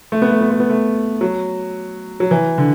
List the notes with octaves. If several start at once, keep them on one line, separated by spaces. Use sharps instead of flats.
A3
B3
A3
B3
A3
B3
A3
F#3
F#3
E3
D3